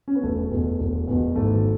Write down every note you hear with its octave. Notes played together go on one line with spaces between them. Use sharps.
C#4
B3
E1 A3
E2 B2
E1
E2 B2
G#1 A3